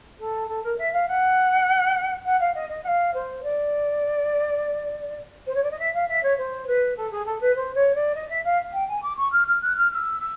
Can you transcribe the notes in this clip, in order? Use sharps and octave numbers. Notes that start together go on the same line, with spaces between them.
A4
A4
A#4
E5
F5
F#5
F#5
F5
D#5
D#5
F#5
F5
C5
D5
C5
C#5
D5
D#5
E5
F5
E5
C#5
C5
B4
A4
G#4
A4
B4
C5
C#5
D5
D#5
E5
F5
G5
G#5
D6
C#6
F6
F6
F#6
F6
F6
E6
E6